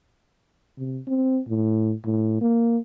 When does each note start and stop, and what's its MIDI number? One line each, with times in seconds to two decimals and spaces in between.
0.78 1.00 48
1.07 1.40 60
1.48 1.93 45
2.05 2.37 45
2.41 2.78 58